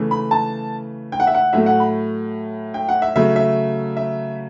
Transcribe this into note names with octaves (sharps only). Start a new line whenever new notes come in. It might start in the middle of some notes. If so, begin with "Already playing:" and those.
Already playing: C#3 E3 A3
B5
A5
G5
F#5
E5
F#5
A2 F#3 A3 E5
F#5
B5
G5
F#5
E5
C#3 F#3 A3 E5
E5
E5